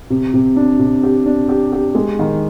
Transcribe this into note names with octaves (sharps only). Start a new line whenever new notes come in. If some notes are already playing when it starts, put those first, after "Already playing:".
C3
C3
D4
C3
G4
D4
G4
G4
G#3
D#3